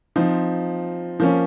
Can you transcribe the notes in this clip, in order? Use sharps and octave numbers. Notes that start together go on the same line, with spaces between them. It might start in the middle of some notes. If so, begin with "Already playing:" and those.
F3 C4 D#4
F3 A#3 C#4